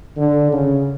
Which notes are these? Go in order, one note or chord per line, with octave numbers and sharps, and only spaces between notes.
D3
C#3